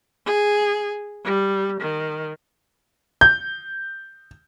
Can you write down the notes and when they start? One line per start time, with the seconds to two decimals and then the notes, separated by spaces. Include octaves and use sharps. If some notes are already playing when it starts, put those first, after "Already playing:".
0.26 G#4
1.24 G3
1.81 D#3
3.21 G6